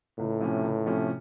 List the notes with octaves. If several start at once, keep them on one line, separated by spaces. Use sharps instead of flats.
C#2 A2
C3 F3 A3 C#4
C#2
C3 F3 A3 C#4